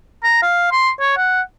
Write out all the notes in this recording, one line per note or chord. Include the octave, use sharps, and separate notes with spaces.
A#5
F5
C6
C#5
F#5